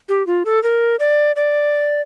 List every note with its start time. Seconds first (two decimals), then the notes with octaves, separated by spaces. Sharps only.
0.09 G4
0.27 F4
0.45 A4
0.63 A#4
0.99 D5
1.36 D5